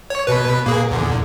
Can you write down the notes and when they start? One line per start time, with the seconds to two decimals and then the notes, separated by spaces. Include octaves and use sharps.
0.10 C#5
0.27 B2 B4
0.66 A#2 A#3 G#4
0.91 E2 D3